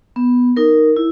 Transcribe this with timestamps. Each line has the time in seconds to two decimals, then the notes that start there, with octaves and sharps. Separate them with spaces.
0.16 B3
0.57 D#4 A#4
0.96 E4